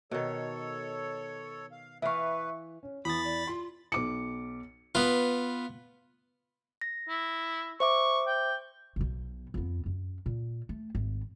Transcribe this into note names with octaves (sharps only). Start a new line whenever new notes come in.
B2 D#3 A4 C#5
F5
E3 B4 E5 F5 C#6
C#4
E2 B5 D#6 A6
D5
F4 C6
B1 D6 C#7
B3 F4 B4
A#6
E4
C5 E5 C#6 D6
G5
B1 B2
F2 B3
F#2
A#2
A3
G#1